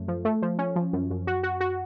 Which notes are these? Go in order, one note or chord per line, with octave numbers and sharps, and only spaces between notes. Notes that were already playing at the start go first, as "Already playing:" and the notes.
Already playing: F#2 A3
F3
A3
F3
C#4
F3
F#2
F#2
F#4
F#4
F#4